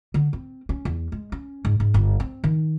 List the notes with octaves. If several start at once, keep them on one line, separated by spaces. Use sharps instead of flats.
D3
C4
C#4
E2
G#3
C#4
G#2
G#2
G1
C4
D#3